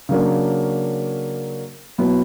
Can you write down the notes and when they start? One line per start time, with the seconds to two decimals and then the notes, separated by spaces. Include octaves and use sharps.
0.09 C#3 F#3 A#3 D4
1.98 B2 F#3 B3 E4